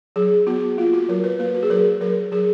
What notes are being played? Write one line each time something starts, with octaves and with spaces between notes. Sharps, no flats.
F#3 G#4
B3 F#4
A#3 F4
F#4
F#3 A#4
B4
A#3 B4
F#4
G#4
F#3 A#4
F#3 A#4
F#3 G#4